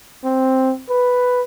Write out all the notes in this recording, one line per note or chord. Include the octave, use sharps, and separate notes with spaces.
C4
B4